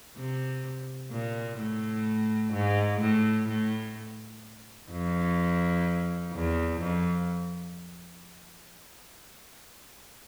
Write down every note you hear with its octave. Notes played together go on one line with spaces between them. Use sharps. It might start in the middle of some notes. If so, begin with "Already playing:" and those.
C3
A#2
A2
G#2
A2
A2
F2
E2
F2